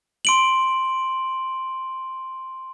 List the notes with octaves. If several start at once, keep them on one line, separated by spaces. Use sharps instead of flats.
C6 D7 F#7